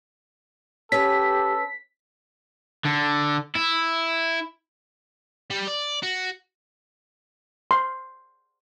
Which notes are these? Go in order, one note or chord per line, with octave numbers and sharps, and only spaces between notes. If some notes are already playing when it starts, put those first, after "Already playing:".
C#4 G4 A4 B4 B6
D3
E4
G3
D5
F#4
C6